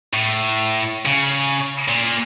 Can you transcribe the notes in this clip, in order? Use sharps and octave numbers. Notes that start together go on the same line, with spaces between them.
A2
C#3
A#2